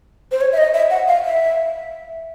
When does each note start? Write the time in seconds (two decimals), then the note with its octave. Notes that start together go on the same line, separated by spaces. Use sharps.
0.32 C5
0.41 C#5
0.53 E5
0.58 D#5
0.74 E5
0.90 F#5
1.08 F5
1.25 E5